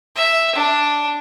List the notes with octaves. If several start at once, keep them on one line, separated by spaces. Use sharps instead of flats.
E5
D4